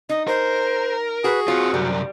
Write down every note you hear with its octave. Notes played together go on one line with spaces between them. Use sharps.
D#4 D#5
A#4 C5
F#4 G#4 B4
C4 F4 F#4 C#5
C2 F#2 G3